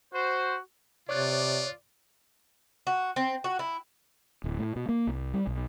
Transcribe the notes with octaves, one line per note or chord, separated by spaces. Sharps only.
F#4 C5
C3 F4 C#5 D5 F#6 A6
F#4
C4
F#4
E4
D1
A2
B2
A#3
C2
G3
B1